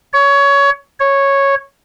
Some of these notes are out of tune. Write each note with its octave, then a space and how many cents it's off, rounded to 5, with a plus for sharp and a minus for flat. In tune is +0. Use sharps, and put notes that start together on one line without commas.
C#5 +20
C#5 -5